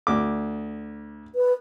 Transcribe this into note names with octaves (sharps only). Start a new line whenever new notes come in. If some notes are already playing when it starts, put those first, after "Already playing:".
D2 D6
B4